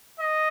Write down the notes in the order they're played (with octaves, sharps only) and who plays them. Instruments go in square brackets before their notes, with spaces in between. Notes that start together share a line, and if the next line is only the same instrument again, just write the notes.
[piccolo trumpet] D#5